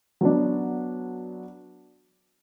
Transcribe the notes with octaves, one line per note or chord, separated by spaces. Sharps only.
F#3 B3 D4